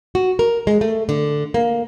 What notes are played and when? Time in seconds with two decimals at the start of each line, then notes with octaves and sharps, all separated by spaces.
0.15 F#4
0.39 A#4
0.67 G#3
0.81 A3
1.09 D3
1.54 A#3